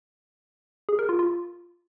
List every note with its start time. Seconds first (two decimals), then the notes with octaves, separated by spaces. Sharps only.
0.89 G#4
0.99 A#4
1.09 F4
1.19 F4